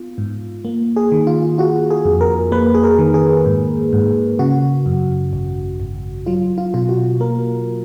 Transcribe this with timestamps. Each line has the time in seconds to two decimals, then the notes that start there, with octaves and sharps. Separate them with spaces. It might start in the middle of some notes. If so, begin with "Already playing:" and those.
Already playing: B3 F4
0.18 G#2
0.65 A#3
0.96 G#4
1.12 D#3
1.27 F4
1.58 F4 F#4
1.91 G#4
2.05 F2
2.21 A#4
2.52 A#3 B4
2.75 G#4
2.84 A#4
2.99 D#3
3.14 G#4
3.46 G#2
3.93 G#2
4.39 C#3 F#4
4.86 F#2
5.33 G#1
5.80 G#1
6.26 F#3 F4
6.58 F4
6.74 B2 F4
6.89 F#4
7.20 A#3 A#4